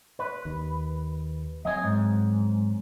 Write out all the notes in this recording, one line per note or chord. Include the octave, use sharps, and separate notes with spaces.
B4
D#2
F#3 C4 D#5 G#5
G#2